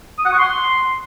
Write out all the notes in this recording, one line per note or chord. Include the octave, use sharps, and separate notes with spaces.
D#6
F#5
C#6
C6